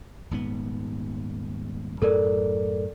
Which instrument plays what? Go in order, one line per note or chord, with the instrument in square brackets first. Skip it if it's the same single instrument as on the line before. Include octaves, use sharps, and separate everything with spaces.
[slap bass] D#1 G#2 B3
[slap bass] F#2 A2 [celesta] A4 A#4 D5